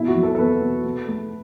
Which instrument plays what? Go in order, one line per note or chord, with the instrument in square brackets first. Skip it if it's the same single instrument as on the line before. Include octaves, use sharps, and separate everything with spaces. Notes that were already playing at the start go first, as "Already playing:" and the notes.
Already playing: [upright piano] B2 E4
F#4
F#3
A4
A4
E2 B4
B2
B2
A3